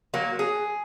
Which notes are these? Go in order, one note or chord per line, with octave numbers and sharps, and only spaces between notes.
F#3 A#3
G#4